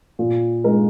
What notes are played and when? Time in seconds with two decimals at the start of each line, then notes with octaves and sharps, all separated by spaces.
0.19 A#2
0.64 G#3 D#4 A#4